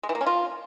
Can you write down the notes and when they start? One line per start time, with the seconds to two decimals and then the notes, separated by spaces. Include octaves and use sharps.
0.03 G#3
0.09 E3
0.15 A#3
0.21 C#4
0.27 F4